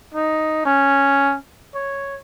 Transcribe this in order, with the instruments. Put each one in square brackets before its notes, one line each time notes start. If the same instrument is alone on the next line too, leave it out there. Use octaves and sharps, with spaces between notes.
[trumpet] D#4
C#4
C#5